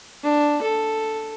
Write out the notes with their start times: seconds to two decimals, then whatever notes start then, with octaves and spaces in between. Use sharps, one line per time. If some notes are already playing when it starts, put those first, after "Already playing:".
0.23 D4
0.62 A4